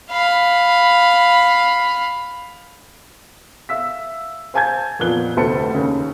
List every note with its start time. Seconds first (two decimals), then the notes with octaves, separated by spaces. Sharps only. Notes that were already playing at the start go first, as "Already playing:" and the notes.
0.11 F5 B5
3.69 E5 F5 E6 B6
4.54 C5 F5 G#5 A5 G6 G#6
4.99 F2 A#2 F3 B3 F#6 G7
5.36 F1 D2 B4 C5 A5 C#7
5.75 D#2 C#3